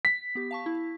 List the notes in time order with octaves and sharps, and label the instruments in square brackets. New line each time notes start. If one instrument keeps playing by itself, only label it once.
[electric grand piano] B6
[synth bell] B3 G4
F5 A5 C#6
E4